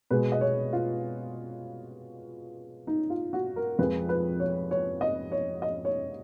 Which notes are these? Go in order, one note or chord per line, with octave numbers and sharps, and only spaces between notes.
B2 G#3 B4
D#5
C#5
F4
D#4
F4
F#4
A#4
F2 F3 G#3 B4
B4
C#5
C#5
D#5
C#5
D#5
C#5